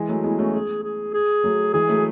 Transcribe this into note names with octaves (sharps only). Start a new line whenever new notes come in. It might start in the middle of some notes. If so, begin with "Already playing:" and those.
Already playing: E3 G#3
F#3 A3
G#3 B3 E4
A3 C#4 F#4
G#4
G#4
G#4
F#3 A3
E3 G#3 G#4
F#3 A3